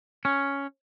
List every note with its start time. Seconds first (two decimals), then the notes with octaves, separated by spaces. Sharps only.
0.25 C#4